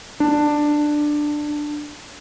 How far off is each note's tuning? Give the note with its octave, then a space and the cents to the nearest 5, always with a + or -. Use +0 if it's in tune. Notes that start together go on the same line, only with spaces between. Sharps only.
D4 +15